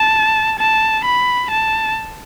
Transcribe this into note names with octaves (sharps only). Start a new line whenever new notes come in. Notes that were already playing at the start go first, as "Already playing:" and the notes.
Already playing: A5
A5
B5
A5